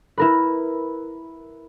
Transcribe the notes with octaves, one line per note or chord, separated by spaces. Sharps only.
E4 A#4 B4